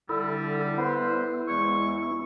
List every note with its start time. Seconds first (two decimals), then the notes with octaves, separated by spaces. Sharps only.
0.09 D3 G3 E4 A4
0.78 B3 E4 B4 C5
1.47 E2 G#3 C#6